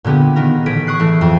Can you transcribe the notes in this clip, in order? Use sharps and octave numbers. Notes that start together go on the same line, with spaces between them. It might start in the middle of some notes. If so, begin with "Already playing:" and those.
A#2 D3 B3 G4 G#4
D#3 B3 A#4
A1 G#4 B6 D7
C#6 D#6 F#6 C7
E3 A3
F2